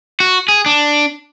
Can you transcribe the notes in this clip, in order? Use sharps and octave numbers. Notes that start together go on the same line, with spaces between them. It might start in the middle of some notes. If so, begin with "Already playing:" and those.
F#4
G#4
D4